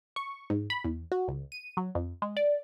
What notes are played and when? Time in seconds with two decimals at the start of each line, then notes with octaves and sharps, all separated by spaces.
0.16 C#6
0.50 G#2
0.70 B5
0.84 E2
1.12 F#4
1.28 C#2
1.52 D#7
1.77 F#3
1.95 F2
2.22 G#3
2.37 D5